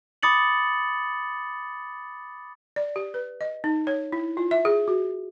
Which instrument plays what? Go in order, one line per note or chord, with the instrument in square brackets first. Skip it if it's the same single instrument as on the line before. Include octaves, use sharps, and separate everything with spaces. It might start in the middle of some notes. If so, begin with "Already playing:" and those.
[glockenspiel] B5 D6 D#6 A6 C#7 F#7
[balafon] D5
G4
B4
D#5
D#4
C#5
E4
F4
E5
G#4
F#4